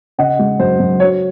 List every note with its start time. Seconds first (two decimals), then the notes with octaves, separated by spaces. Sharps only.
0.18 C#3 D#5 F#5
0.39 G#3
0.60 F#2 C5
0.80 F#2
1.00 F#3 C#5